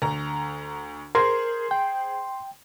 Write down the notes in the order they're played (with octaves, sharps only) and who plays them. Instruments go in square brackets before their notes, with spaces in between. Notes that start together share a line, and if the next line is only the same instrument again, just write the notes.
[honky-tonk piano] D2 A#5
[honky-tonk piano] G#4 C5 G#6 [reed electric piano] A#4 [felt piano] C6
[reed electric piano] G5